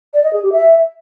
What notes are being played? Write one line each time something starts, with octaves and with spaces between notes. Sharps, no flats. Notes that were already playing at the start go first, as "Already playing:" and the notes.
D5
D#5
G#4
G4
E5